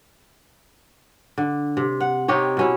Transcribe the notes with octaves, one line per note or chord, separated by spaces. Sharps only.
D3
C3
F#5
C3 D#4 G4 C#5
B2 C#4 E4